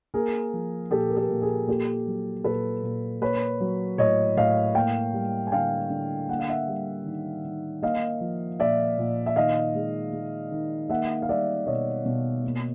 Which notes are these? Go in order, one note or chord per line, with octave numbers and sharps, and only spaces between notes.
A#3 G#4 A#4
F3
A#2 G4 A4
A#4
G4 A4
A#2
G#4 A#4
A#3 G4 A4
F#3
A#2 A4 B4
A#2
A#3 B4 C#5
F#3
A2 C#5 D#5
A2 D#5 F5
A#3 F5 G5
G3
G#5
D3 F5 G5
D3
A#3 F#5
F5
E5 F#5
G3
D#3
D#3
A#3 D#5 F5
F3
A#2 D5 E5
A#2
E5
D#3 D#5 F5
G#3
G#3
D#3
A#3 E5 F#5
F5
G3 D5 E5
B2 C#5 D#5
B2
A#3